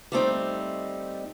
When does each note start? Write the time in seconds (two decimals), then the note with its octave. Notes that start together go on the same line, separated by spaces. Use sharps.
0.12 G3 A3 C4 D#4